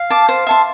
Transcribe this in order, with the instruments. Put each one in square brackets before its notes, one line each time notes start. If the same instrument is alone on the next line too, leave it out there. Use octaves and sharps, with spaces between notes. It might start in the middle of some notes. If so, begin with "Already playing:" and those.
Already playing: [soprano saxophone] F5
[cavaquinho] A5 D6
C5
E5 A5 C6